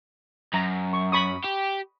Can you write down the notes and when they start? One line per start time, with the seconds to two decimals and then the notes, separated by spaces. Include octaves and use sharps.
0.54 F#2 A#5
0.93 C#6
1.12 B5 C#6 D#6
1.44 G4